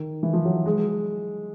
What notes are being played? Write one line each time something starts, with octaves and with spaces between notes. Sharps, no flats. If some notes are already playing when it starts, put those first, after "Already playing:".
Already playing: D#3
E3
F3
F#3
G#3